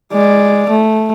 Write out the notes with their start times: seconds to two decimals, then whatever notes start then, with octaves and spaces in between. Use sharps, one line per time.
0.13 G#3 D5
0.69 A3